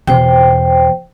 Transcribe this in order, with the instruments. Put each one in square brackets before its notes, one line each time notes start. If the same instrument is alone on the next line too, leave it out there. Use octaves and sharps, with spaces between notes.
[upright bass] E2 B2 [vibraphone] C5 G5